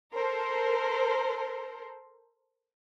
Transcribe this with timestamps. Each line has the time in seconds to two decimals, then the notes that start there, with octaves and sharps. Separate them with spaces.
0.13 A4 A#4 C5